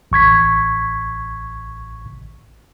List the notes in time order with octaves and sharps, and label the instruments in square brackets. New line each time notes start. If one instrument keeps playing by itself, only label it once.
[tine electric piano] A1 C#6 G#6 B6